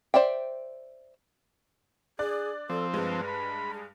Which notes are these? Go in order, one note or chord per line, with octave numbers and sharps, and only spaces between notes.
C5 D5 E5 G5
D4 G#4 D5 F#6
F3 C4 A4
G2 G#3 B4
B5
G#4